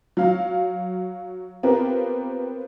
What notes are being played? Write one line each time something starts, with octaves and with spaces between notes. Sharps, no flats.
F#3 F5
B3 C4 F4 G4 A#4 B4